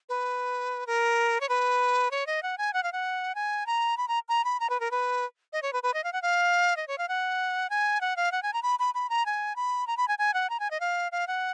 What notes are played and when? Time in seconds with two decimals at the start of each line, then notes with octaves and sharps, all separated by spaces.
0.09 B4
0.87 A#4
1.41 C#5
1.49 B4
2.11 C#5
2.27 D#5
2.43 F#5
2.58 G#5
2.73 F#5
2.83 F5
2.92 F#5
3.35 G#5
3.66 A#5
3.97 B5
4.08 A#5
4.29 A#5
4.44 B5
4.60 A#5
4.70 B4
4.80 A#4
4.91 B4
5.53 D#5
5.62 C#5
5.73 B4
5.83 B4
5.94 D#5
6.04 F5
6.13 F#5
6.22 F5
6.77 D#5
6.88 C#5
6.98 F5
7.08 F#5
7.70 G#5
8.01 F#5
8.16 F5
8.32 F#5
8.43 G#5
8.53 A#5
8.63 B5
8.79 B5
8.94 B5
9.10 A#5
9.26 G#5
9.56 B5
9.87 A#5
9.97 B5
10.08 G#5
10.19 G#5
10.34 F#5
10.50 A#5
10.60 G#5
10.71 D#5
10.80 F5
11.12 F5
11.27 F#5